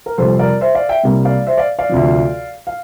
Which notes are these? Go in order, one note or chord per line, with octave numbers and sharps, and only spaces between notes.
A#4
F2 C3 G3 A4 C5
A#4 D5
C5 E5
D5 F5
E5 G5
C2 C3 G3 A#3
D5 F5
C5 E5
D5 F5
D5 F5
D2 C3 F3
F5